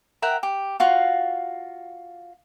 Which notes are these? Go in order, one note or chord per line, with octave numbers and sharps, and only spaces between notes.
A#4 E5 F#5 G5
G4
F4 F#4 F5